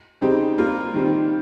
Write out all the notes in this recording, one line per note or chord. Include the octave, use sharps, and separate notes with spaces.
C#3 G3 C4 D#4 G4
G3 A#3 F4 A#4
D#3 G3 C4